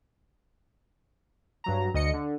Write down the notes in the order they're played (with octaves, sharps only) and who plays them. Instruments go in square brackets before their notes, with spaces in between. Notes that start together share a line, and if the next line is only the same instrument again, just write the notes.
[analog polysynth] G2 F#3 A#5
D2 D#5 C#7
D3